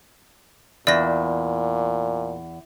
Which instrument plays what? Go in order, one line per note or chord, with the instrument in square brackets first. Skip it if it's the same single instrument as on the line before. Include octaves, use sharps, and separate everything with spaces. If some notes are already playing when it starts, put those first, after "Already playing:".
[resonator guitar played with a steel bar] E2 [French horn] A#2 [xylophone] D5 A#6